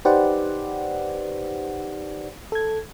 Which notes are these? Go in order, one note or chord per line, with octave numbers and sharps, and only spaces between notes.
D#4 G4 B4 C5 D5 F#5
A4 G#6